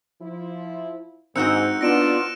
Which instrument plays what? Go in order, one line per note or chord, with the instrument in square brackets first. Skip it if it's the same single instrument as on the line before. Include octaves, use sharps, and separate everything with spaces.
[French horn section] F3 E4
[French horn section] G#2 [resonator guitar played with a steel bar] C4 D#4 F#4 [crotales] E6 F#6 C#7
[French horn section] B3 D4 [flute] F4 [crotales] A#6 D7 E7